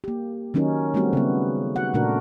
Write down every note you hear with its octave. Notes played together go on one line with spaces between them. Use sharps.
A#3 G4
D#3 F#3 C#4 D#4 A#4
G3 A3 B3 C4 F#4 G4
C#3 F#3 B3
F#4 F#5
A#2 C#3 A3 D4 F#4 A#4